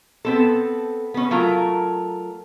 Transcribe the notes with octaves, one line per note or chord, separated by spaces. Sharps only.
B3 C4 A4
B3 C#4
F#3 A3 F4 A#4